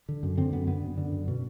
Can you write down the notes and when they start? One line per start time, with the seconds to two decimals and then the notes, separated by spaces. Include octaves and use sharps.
0.09 D3
0.23 F#2
0.37 D3 C4
0.52 F#2 B3
0.67 D3 B3
0.83 F#2
0.98 D3
1.12 F#2
1.28 B2